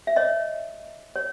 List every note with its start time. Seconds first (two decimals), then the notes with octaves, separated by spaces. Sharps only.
0.07 E5
0.16 C#5 D#5
1.16 C#5